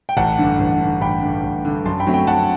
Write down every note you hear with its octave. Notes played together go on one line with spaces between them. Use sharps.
G5
A1 F#5 A5
G2 D3
A1
G2 D3
A1 G5 B5
G2 D3
A1
G2 D3
F#2 A5 C6
G5 B5
D3 F#3 A3 C4
G5 B5
F#2 F#5 A5